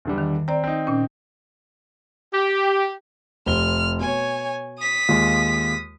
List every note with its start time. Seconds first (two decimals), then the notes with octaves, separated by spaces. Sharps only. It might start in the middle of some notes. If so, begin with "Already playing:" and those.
0.05 E2 D3 G3
0.18 D#3
0.48 C4 D5 A#5
0.64 C4 D#4
0.87 A#2 C#4
2.34 G4
3.46 F1 C4 F6 G7
4.00 B2 C#5 G#5
4.79 D#6 B6
5.09 D#2 G#3 F4